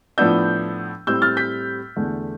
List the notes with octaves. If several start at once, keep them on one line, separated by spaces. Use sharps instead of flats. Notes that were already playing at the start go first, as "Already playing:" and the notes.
A2 F3 B3 D4 E6 G6
A2 G3 C4 E6 G6
F6 A6
G6 B6
E2 D3 A3